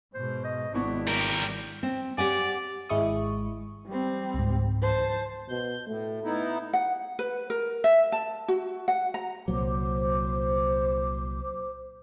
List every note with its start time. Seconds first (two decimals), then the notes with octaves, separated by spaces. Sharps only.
0.14 G#2 B2 C5
0.44 D#5
0.75 G#1 B3 D4 E4 C#6
1.08 G3 A#4
1.83 C4
2.18 G4 D5 F#5 G#5
2.89 G#1 G#3 E4 C#6 D#6
3.87 G3 C4
4.34 C#2 G#2
4.82 C5 A5
5.49 B2 G6
5.88 A2 A3
6.24 B3 D#4 E4
6.73 F#5
7.19 B4
7.50 A#4
7.84 E5
8.12 A5
8.48 F#4
8.88 F#5
9.14 A#5
9.48 C2 A#2 F#3 C5 D6